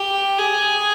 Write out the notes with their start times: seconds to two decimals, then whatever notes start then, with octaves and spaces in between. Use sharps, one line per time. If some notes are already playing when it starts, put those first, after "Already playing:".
Already playing: G4
0.38 G#4